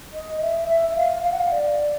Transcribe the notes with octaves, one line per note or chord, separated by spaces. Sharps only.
D#5
E5
E5
F5
F5
F#5
F5
D5